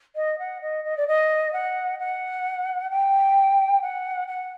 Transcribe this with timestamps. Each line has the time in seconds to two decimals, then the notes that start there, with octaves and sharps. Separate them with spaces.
0.15 D#5
0.38 F#5
0.61 D#5
0.84 D#5
0.97 D5
1.07 D#5
1.53 F#5
1.99 F#5
2.90 G5
3.82 F#5
4.27 F#5